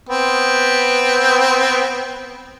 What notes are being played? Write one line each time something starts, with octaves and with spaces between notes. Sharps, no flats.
B3 C4